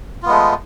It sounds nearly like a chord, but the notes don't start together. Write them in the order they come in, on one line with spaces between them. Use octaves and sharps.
F4 B3 G#3 A3